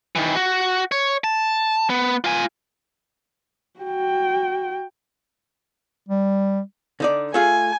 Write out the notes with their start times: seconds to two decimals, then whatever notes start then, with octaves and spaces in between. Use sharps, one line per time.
0.15 D#3 E3
0.36 F#4
0.92 C#5
1.24 A5
1.90 B3
2.24 F4 G#5
3.80 F#4 G5
6.09 G3
7.00 D3 D#4 D5
7.34 A3 F4 G#4 G#5